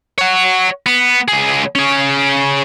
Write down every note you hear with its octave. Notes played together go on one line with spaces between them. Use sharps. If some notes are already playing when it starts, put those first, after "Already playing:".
C#5 F#5
B3
C#2 G#4
C#4 G#4